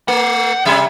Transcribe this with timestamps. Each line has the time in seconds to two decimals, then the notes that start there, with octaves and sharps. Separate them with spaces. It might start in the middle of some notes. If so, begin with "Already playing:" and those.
0.08 A3 F#5
0.65 C3 G3 E5